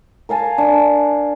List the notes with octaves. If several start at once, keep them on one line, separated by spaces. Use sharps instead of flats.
A#4 F5 G#5 A5
D4